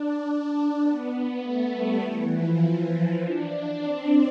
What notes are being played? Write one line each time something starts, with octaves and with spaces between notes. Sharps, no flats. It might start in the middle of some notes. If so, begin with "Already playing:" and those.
Already playing: D4
B3
B3
A3
G3
E3
F3
F3
D4
C4